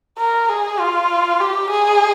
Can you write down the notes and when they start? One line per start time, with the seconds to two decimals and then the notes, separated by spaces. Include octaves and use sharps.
0.18 A#4
0.49 G#4
0.79 F4
1.40 G4
1.71 G#4